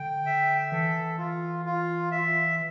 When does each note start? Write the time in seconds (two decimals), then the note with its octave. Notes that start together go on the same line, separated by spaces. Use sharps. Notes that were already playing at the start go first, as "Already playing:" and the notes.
Already playing: D3 G5
0.26 E5
0.72 E3 A4
1.18 F4
1.65 F4
2.12 E5